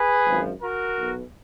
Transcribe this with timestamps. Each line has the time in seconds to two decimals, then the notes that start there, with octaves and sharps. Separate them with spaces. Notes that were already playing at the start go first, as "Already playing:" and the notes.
Already playing: G#4 B4
0.26 G#1 F#2 F3
0.62 F#4 A#4
0.98 B1 B2